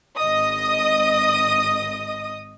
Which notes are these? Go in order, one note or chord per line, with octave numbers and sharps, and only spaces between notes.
G#1 D#5 D#6